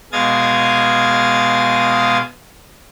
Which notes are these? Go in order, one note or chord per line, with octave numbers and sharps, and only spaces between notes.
B2 G#3 F5 D#6 G#6 A6